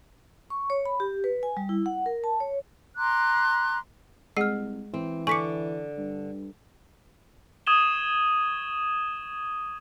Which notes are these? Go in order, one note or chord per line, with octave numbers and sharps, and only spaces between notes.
C#6
C#5
B5
G4
B4
G#5
G3
E4
F#5
A#4
A5
C#5
A#5 C6 D6 F#6
C2 G#3 G#4 F#5 F6 C7
E3 C4
D3 G#5 C#6 D6 B6 C#7
G2
C#6 D#6 G#6 D#7 E7 G7